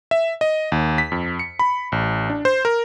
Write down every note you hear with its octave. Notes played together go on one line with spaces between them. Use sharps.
E5
D#5
D#2
B6
F2
C#7
B5
A1
D4
C5
A#4